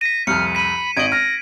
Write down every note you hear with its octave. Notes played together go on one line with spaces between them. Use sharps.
A#6 B6 D#7
C2 F2 F6 C#7
B5 B6 D#7
G#1 D#5 G#6 D7 F#7
F6 A#6